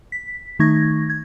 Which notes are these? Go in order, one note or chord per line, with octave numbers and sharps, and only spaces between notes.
B6
D#3 A3 D#4 C#6 G#6 A#6
G#6